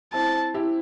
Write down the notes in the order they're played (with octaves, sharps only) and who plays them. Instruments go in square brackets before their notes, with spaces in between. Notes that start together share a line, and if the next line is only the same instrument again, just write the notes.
[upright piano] C4 E4 [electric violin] A5
[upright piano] E4 G4